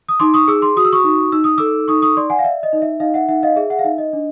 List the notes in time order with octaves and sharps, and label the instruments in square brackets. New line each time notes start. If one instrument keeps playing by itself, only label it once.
[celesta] D#6
D#4 C6 D6
C#6 D#6
G#4 D6 E6
C6 D6
F#4 D#6
E6
C#6 D#6
D#4
D#4 E6
D#6
A4 D6 E6
D#4 C#6 D#6
C#6 D#6
D5 C6 D6
F#5 G#5
F5
D5 E5
D#5
D#4
E5
D#4 D#5 F5
E5 F#5
D#4 E5 F#5
D#5 F5
G#4 E5
E5 F#5
F5
D#4 E5
D#5
D4